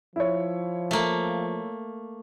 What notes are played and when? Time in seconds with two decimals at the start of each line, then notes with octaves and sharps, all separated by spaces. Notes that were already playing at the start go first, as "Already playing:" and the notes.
0.16 F3 E4 C#5
0.91 A3 A#3